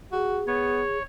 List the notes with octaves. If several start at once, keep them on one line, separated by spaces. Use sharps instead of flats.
F#4 G#4
B3 C#5